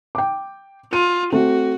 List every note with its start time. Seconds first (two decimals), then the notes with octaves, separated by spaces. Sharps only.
0.15 G5 D6
0.93 F4 D#7
1.32 A3 C4 F#4